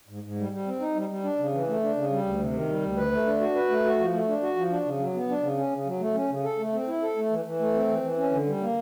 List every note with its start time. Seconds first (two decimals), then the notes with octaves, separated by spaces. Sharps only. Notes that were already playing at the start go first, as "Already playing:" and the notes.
0.09 G#2
0.23 G#2
0.38 G3
0.52 G3
0.66 C4
0.80 D#4
0.95 G3
1.09 G3
1.24 D4
1.39 C#3
1.53 E3
1.68 A3
1.82 D4
1.96 C#3
2.10 G3
2.26 D2
2.40 C3
2.53 D#3
2.68 G3
2.83 D2
2.97 B4
3.12 A3
3.26 D4
3.41 F#4
3.55 B4
3.70 A3
3.85 F#4
3.99 F3
4.12 A3
4.28 D4
4.41 F#4
4.56 F3
4.70 D4
4.85 C#3
4.99 F#3
5.14 B3
5.29 D4
5.42 C#3
5.58 C#4
5.72 C#3
5.86 F#3
6.00 A3
6.14 C#4
6.30 C#3
6.44 A4
6.58 A3
6.73 C4
6.88 E4
7.02 A4
7.16 A3
7.30 E3
7.45 E3
7.60 A3
7.74 C4
7.88 E3
8.03 E3
8.17 C#4
8.31 D3
8.46 G3
8.61 A#3